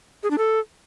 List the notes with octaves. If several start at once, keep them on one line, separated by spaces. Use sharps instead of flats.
G#4
D4
A4